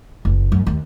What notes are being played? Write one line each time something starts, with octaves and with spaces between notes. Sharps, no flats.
F#1
F#2
D#2